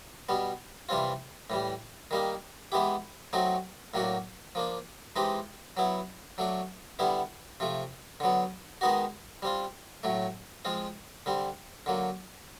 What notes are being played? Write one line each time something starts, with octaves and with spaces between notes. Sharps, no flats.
B2 G3 B3
C3 E3 G3 C4 F4
A2 E3 G3
D#3 G3 A#3 D#4
E3 G#3 B3 E4 G4
F#3 A3 C4 D#4 F#4
A2 F#3 A#3 D4 F#4
F3 A#3 D4
E3 G#3 C4 D#4 G4
F#3 B3 E4
F#3 A3 D4
D3 G3 B3 E4
C3 F3 A3
D3 F#3 B3
D#3 G#3 B3 D#4 F#4
G3 C4 F4
A2 F#3 A3
F3 G#3 C4 F4
D3 G3 C4
D3 F#3 A#3